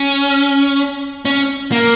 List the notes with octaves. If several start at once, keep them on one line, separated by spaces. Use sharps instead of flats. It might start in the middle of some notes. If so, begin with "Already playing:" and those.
Already playing: C#4
C#4
A#3